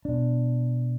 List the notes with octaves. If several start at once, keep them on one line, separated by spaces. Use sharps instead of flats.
B2 D4